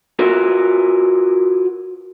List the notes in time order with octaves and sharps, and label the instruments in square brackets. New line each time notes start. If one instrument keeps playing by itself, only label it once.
[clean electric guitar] F4 F#4 A#4 B4 C#5